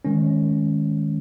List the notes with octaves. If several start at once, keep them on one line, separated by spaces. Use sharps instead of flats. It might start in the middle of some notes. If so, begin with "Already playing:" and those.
D#3 G#3 C#4